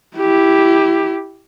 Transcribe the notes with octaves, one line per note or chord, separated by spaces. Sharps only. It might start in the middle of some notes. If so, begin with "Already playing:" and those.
E4 G4